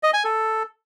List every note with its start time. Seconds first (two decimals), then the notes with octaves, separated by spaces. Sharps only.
0.03 D#5
0.14 G#5
0.24 A4